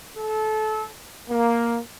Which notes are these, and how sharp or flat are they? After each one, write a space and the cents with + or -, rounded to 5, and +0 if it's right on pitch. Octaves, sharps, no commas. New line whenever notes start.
A4 -25
A#3 +5